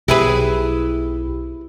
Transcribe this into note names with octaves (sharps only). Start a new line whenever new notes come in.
B1 E4 G4 G#4 B4